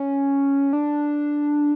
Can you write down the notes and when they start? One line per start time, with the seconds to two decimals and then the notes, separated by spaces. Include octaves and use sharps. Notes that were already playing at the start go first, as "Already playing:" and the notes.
Already playing: C#4
0.73 D4